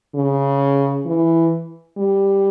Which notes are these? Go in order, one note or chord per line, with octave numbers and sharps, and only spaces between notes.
C#3
E3
G3